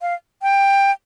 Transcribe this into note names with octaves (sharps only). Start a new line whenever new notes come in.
F5
G5